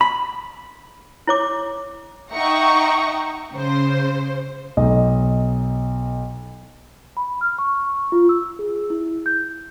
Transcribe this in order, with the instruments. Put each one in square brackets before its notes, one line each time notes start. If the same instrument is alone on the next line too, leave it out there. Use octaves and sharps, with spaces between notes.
[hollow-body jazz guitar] B5
[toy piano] E4 C#5 D6
[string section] D#4 E5 F#5 G5 A#5 C#6
C#3 C5
[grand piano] B1 D#5
[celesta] B5
F6
C#6
F4
E6
G#4
E4
G6